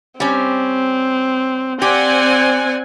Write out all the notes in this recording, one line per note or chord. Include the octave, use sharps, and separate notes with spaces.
G3 C4 C#4
C4 G4 D5 F#5 G#5